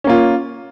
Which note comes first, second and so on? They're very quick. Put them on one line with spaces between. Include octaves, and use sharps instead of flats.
C#4 A#3 F4